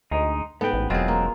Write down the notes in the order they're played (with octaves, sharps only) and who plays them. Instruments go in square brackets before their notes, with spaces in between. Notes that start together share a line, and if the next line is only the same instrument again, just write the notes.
[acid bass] D2 [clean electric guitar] G#3 D#4
[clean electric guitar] G#2 G5 [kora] B3 B4 [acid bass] A4
[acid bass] A1
[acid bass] E1 [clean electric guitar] F#3 G#3 C4 [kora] F4 G#4
[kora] A#3